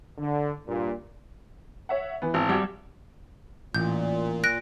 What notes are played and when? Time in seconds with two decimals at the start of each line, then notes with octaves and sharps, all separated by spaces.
0.18 D3
0.67 G2 A#2
1.89 C#5 E5 F#5
2.22 E3 B3
2.34 G#1
2.49 G3 F#4 G#6
3.74 A1 A#2 G6
4.44 F#6 A#6 D7